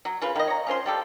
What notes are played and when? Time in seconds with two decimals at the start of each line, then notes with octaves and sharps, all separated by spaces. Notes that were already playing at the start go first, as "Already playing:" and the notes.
0.05 F#3
0.21 C#3 F4 B4
0.36 D#3 D#5
0.48 C#5 A#5
0.67 C#4 F4 C5 C6
0.86 G3 G4 A4